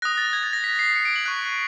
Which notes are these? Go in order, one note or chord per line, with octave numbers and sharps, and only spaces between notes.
D#6 F#6 A#6
A6
G#6
A6
A#6
B6
C7
C#7
D7
F#7
C#6 F#6